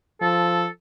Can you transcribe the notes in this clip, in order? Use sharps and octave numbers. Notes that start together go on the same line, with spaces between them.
F3 A4